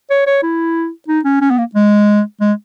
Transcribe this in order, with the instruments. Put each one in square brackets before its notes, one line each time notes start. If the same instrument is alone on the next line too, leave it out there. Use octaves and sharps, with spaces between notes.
[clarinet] C#5
C#5
E4
D#4
C#4
C#4
B3
A#3
G#3
G#3